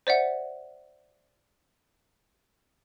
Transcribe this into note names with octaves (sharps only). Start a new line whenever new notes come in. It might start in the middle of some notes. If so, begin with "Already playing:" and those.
C5 D5 E5 F#5